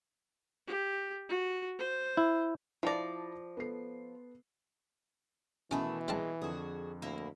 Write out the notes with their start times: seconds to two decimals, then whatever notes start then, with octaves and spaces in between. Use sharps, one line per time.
0.67 G4
1.29 F#4
1.79 C5
2.17 E4
2.83 F3 E4 D5 A5 A#6
3.57 B3 A4 C7
5.71 B2 D#3 E3 A3 C#4 E4
6.08 G3 G#3 C4 A5
6.42 F2 D3 F#4 G#4
7.02 D2 A#3 E4